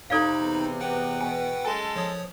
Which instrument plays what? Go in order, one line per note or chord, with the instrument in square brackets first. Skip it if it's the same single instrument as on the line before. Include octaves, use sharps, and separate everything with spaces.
[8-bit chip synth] F2 D#4 B5 [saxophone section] C3 C4 [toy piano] A4 D5 F5
[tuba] E2
[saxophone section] C3 B3 [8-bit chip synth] B4 F#5 G5
[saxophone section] B2 [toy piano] G#5
[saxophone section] F#2 G#3 A4 [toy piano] G#5
[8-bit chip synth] F3 C#5 D#6